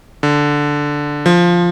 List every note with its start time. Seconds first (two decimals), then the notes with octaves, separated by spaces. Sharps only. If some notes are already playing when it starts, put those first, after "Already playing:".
0.23 D3
1.26 F3